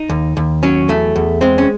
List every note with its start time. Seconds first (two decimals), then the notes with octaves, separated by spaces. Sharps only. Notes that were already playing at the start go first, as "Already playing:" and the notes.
Already playing: D#4
0.09 D#2
0.37 D#2
0.63 F#3 C#4
0.89 E2 A3
1.16 E2
1.41 G#3 C4
1.58 C#4